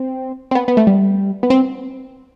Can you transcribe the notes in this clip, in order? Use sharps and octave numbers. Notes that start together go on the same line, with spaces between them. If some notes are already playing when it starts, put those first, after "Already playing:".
Already playing: C4
C4
B3
B3
A3
G3
B3
C4